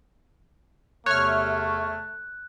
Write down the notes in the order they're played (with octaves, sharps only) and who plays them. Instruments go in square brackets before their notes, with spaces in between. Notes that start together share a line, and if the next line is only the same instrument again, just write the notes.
[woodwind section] E2 C3 [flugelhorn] A3 [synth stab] C#5 F6 [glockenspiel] F#6